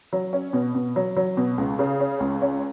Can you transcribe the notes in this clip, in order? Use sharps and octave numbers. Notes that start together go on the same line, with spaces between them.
F#3
C#4
B2
B2
F#3
F#3
B2
C#2
C#3
C#4
C#2
C#4